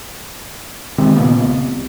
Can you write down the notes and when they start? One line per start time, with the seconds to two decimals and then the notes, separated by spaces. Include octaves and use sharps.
0.98 C3 D#3 G#3 C4
1.16 A#2 C#3 A#3 B3
1.45 C2